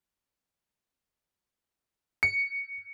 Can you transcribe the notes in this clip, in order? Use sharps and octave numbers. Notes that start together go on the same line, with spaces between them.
C#7